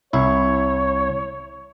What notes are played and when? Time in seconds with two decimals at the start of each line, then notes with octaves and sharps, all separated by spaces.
0.13 C2 E4 C#5